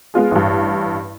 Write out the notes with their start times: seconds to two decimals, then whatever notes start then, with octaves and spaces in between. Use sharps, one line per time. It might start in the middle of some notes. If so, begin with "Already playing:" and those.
0.14 G#3 B3 F4 G#4
0.31 A1 G2